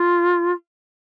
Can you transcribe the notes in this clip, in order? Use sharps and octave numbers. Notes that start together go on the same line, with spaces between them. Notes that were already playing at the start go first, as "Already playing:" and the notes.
Already playing: F4